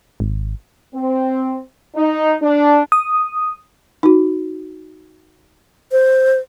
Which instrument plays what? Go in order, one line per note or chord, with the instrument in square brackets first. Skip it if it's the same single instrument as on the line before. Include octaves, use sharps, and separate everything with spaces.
[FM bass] G#1
[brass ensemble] C4
D#4
D4
[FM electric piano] D#6
[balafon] D#4 F#4
[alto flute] C5